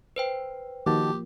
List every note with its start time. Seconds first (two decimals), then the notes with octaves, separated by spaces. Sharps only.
0.16 B4 C5 G5
0.87 D#3 F3 A#3 F#4 G4 A5